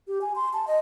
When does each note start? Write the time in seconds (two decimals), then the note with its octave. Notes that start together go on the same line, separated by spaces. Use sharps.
0.08 G4
0.21 G#5
0.36 C6
0.53 A5
0.67 D#5